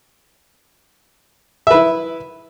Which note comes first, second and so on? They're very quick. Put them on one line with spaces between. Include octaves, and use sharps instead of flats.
E5 B4 E4